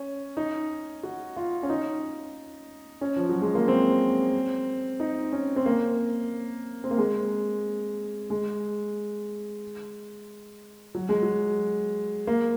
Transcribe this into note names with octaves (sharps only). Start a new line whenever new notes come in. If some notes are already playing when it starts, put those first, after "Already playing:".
Already playing: C#4
D#4
F#4
F4
C#4
D#4
C#4
F3
F#3
G#3
A#3
C4
D#4
C#4
C4
A#3
C4
A#3
G#3
G#3
F#3
G#3
F#3
A#3